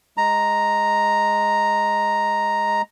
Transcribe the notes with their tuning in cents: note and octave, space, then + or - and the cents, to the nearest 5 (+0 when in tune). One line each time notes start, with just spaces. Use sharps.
G#3 +0 A#5 +0